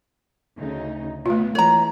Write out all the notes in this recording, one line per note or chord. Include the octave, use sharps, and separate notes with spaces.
D2 C#3 D#4
B2 A3 B3 F4
E3 G#3 C#5 A#5